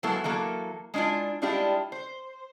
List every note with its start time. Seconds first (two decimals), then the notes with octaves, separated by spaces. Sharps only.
0.03 F#3 G#3 A#3 B3 E4 A4
0.24 E3 F#3 A#3 A4
0.94 G#3 C#4 D4 E4 F4
1.42 G3 G#3 D4 E4 F4 G4
1.92 C5